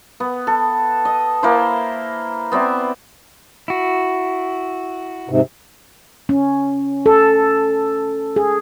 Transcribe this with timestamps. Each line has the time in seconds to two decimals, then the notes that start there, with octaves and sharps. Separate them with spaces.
0.20 B3
0.47 A4
1.05 D#5
1.43 A#3 E4 C5
2.52 B3 C4 D5 E5
3.68 E4 F#4
5.29 G#2 C3
6.29 C#4
7.06 A4
8.36 G#4